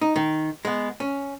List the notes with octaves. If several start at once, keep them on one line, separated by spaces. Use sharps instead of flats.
D#4
D#3
G#3 B3
C#4